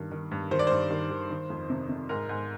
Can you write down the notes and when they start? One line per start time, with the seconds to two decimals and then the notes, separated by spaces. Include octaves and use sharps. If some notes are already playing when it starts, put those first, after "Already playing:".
Already playing: G2 D#3
0.12 D#3
0.31 G2
0.51 D#3 C5
0.59 D5
0.67 G2 C5
0.91 D#3
1.10 D#3
1.30 D#3
1.50 F2
1.70 C3
1.89 C3
2.09 G#2 A#4
2.29 G#2